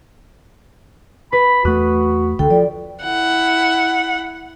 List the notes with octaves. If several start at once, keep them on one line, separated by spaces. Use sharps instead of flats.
B4 B5
E2 A3 F#4 D#6 F#6
C#2 D3 A4 G5
F3 D5
E4 F#5